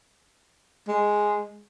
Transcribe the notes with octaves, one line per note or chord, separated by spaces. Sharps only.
G#3